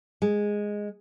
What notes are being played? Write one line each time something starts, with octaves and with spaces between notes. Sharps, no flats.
G#3